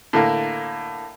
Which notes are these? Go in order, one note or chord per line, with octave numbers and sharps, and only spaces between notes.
A2 D3 A#3